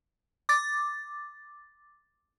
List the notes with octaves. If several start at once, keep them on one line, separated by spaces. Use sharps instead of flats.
D6 A6